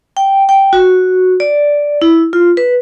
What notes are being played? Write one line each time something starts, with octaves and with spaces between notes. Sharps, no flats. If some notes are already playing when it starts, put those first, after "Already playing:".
G5
G5
F#4
D5
E4
F4
B4